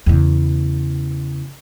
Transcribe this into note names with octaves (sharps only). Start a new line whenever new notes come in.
E2 C#3